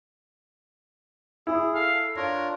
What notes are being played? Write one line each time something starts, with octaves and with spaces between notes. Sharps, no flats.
E4 G#4
A4 F5
D4 F4 A#4 C#5